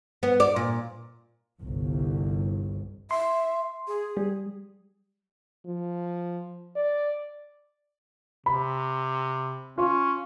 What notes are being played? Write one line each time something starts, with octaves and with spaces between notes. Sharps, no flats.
B3
D5
A#2
G1 C2
E5 C6
G#4
G3
F3
D5
C3 B5
C#4 F4